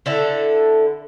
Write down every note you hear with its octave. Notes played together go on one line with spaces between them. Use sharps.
D3 E4 A4